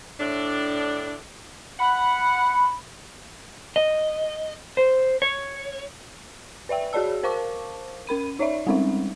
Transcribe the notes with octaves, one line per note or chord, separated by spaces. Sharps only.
A2 D4
F#5 B5
D#5
C5
C#5
B4 D5 E5 G5
F#4 G#4 C#5 D5 A5 E6
A#4 C5 F5 A5 C#6 D6
C#4 A#4 B5 D#7
D#4 C#5 D5 E5
G3 G#3 C4 C#4 D#4 E5